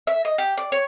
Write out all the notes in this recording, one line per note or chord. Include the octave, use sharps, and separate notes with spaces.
E5
D#5
G4
D5
C#5